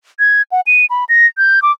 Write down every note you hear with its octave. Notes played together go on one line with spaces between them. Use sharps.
G#6
F#5
D#7
B5
A#6
G6
D6